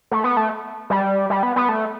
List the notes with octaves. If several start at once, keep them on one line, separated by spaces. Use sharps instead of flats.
A3
B3
A3
G3
G3
B3
B3
A3